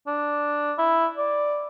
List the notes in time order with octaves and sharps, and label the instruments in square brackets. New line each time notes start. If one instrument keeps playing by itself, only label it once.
[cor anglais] D4
E4
D5